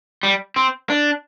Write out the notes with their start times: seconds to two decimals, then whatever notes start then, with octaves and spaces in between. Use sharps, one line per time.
0.23 G3
0.56 C4
0.90 D4